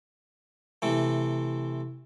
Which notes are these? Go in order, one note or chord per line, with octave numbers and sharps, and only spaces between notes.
C3 E3 A3